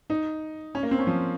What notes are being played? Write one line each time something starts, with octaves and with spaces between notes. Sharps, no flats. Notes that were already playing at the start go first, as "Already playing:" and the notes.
D#4
C#4
A#3
C4
C#4
F3